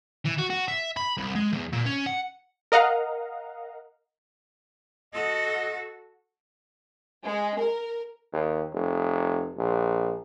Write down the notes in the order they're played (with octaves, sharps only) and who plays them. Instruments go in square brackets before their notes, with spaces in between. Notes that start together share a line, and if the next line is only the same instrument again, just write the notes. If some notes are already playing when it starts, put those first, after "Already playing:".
[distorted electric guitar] E3
F#4
F#4
E5
B5
C2
G#3
E2
A#2
C#4
F#5
[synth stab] A#4 D#5 F5 F#5 A#5
[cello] F#4 A4 [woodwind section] D#5
[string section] G#3
A#4
[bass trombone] D#2
F1
A#1